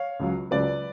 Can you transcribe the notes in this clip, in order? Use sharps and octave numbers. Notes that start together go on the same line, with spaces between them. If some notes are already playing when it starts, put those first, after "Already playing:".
Already playing: C#5 F5
C#2 C#3 F#3
C#2 C#3 F#3 B4 D5